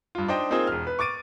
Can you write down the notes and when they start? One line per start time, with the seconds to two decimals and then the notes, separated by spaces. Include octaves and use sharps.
0.15 G2 F4
0.28 D4 D#4 C5 D#5 G5
0.50 A#3 C4 D#4 F4 G#4 C5
0.67 E1 F6
0.87 B4
0.99 C#6 D6 A6 D7 D#7